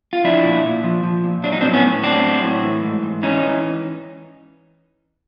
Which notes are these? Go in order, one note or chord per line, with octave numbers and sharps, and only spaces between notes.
F4
F3 D4 E4
A#2
A#2
F3
F3
A#2
F#3 D4
D#4
C4 D4
A2
B3 C#4
A2
F#3 C4 D4
F#3
A2
E3
G#2
G#2
E3 C#4 D#4
E3